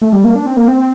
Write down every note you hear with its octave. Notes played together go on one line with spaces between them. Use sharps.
A3
G3
A#3
D4
C4
A#3
C4